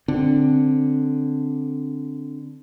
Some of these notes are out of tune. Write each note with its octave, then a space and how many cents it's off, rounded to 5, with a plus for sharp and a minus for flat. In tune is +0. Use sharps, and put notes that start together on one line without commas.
D3 +0 C4 +0